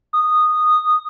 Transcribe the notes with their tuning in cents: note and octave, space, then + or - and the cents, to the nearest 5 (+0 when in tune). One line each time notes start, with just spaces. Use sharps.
D#6 -10